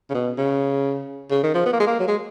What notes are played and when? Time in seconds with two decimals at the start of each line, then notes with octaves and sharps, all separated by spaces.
0.10 C#3
0.14 B2
0.38 C#3
1.30 C#3
1.43 D#3
1.54 F3
1.66 B3
1.73 A#3
1.80 G#3
1.87 A#3
2.00 F#3
2.08 G#3